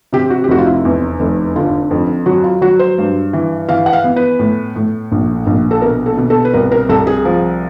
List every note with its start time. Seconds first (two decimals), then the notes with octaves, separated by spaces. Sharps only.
0.13 C3 G4
0.30 F#4
0.44 G4
0.49 F1 F#4
0.58 F4
0.66 E4
0.85 E2
1.20 F1
1.56 D3 F4
1.91 F2
2.26 F#3 F#4
2.44 F4
2.62 F#3 F#4
2.79 C5
2.98 G2
3.33 E3
3.69 E3 F5
3.86 F#5
3.93 F5
4.04 B3
4.16 B4
4.39 A2
4.76 A2
5.12 A#1
5.47 A#1
5.71 A4
5.82 B2 A#4
6.06 A4
6.17 B2
6.30 A4
6.45 B4
6.53 C2 A#4
6.72 A#4
6.89 C2 A4
7.07 G#4
7.25 F3